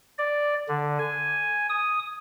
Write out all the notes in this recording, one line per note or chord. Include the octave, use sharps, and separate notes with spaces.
D5
D3
G#5
D#6